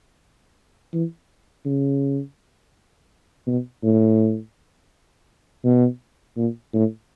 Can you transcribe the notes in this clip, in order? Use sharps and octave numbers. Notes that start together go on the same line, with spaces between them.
E3
C#3
B2
A2
B2
A#2
A2